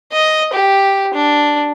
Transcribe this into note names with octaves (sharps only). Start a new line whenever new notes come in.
D#5
G4
D4